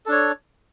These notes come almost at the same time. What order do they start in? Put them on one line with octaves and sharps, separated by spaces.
A4 D4 C#5